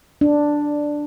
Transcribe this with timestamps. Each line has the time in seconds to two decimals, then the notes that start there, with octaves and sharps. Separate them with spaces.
0.21 D4